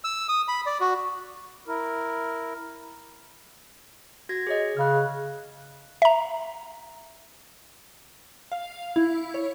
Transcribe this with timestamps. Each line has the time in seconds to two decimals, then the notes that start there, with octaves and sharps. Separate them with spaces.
0.04 E6
0.29 D#6
0.48 B5
0.66 D5
0.81 F#4
1.68 E4 A#4
4.29 F#4 G#6 A#6
4.47 G#4 C#5 D#5
4.77 C#3 F6 F#6
6.02 E5 A#5
8.52 F5
8.96 E4
9.34 C#5